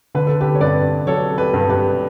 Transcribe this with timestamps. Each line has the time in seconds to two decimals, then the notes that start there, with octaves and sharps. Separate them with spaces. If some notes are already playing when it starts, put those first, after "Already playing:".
0.15 D3 B4
0.27 A4
0.41 G4 B4
0.55 C#5
0.60 G2 B4 D5
1.07 F#3 A4 C#5
1.38 G4 B4
1.54 G2
1.70 G4 B4